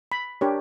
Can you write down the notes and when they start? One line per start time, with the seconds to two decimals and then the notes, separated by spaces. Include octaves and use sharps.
0.12 B5
0.41 D4 G4 A#4 C#5